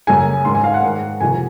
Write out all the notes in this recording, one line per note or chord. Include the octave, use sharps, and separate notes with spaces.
F#2 C#3 G#5
G#2 D#3 C6
G#5
F5
F#5
G#2 D#3
F2 C3 D#3 G#5